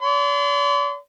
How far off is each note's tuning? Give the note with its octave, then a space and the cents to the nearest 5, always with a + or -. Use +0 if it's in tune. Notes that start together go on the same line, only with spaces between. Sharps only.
D5 -45 C6 -45